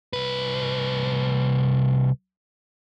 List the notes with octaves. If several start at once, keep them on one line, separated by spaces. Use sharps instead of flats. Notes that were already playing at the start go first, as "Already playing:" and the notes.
C2 B4